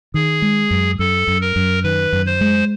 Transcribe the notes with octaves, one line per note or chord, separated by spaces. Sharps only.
D#3 G#4
G#3
F#2
F#2 A4
F#2
A#4
F#2
D#3 B4
F#2
C5
G#3